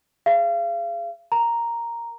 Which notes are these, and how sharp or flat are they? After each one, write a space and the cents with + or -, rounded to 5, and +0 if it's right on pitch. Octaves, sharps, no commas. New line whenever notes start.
G#4 +0 F5 -35
A#4 +0 A#5 +0